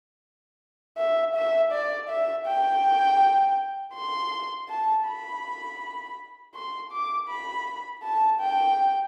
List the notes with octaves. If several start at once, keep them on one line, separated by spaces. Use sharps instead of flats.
E5
E5
D5
E5
G5
C6
A5
B5
C6
D6
B5
A5
G5